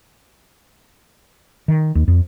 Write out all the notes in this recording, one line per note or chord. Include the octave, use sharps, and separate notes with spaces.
D#3
D#2
F2